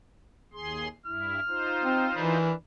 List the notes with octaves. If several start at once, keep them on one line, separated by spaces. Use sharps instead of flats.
D#2 G#4 C6
G2 E4 F6
D#4 F4 C5
C4
E3 D4 A#4 B5